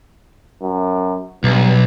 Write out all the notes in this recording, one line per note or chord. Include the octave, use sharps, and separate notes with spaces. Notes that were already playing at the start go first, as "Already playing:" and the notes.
F#2
B1 G2